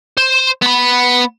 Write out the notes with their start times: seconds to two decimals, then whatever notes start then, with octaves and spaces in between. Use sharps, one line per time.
0.18 C5
0.62 B3 B5